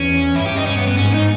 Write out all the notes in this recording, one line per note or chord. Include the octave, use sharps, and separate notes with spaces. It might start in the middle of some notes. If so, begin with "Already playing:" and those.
Already playing: E2 C#4
G2 E4
G4
D#4
C#4
B3
B3
G#2 C#4
D#4